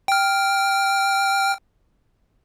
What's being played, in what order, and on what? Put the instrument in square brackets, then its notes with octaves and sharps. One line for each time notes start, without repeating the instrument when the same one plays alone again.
[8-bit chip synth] G5 F6